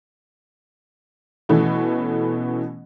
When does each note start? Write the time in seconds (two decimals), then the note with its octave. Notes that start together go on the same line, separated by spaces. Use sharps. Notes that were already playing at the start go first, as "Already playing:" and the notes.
1.49 B2 E3 A3 B3 C#4